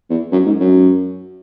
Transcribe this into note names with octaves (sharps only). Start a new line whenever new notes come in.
E2
F#2
G#2
F#2